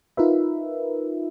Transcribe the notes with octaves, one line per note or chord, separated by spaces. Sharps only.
D#4 F4 A#4 B4 E5